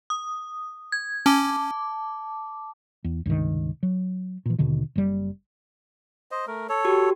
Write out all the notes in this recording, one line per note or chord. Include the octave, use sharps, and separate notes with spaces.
D#6
G#6
C#4 A5 D6
E2
C#2 G2 C3 D#3
F#3
A#2 E3
D#2 B2 D3 D#3
F#1 G3
C5 D#5
A3 A#4
A4 C#5
F#4 G4